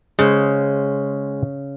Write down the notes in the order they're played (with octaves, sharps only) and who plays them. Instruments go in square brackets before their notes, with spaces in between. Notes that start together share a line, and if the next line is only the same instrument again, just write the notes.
[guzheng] C#3 [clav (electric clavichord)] G#3 C5